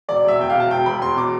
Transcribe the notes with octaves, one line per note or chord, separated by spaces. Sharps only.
E1 D5
E1 E5
E2 G5
B2 F5
A5
E1 G5
E1 B5
E2 C6
B2 D6